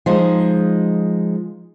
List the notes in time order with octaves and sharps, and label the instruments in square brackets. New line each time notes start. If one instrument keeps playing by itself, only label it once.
[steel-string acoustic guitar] F3 G#3 D#4